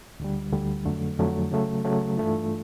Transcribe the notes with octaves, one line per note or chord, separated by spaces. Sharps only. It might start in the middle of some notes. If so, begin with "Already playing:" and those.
D2 D3 G3
D2 D3 G3
F2 D3 F#3 A3
F2 D3 F#3 A3
C#3 F#3 A3
C#3 F#3 A3
G2 E3 A3 D4 F4